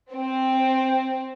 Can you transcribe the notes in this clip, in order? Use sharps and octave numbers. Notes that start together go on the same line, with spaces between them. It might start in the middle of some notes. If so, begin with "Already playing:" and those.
C4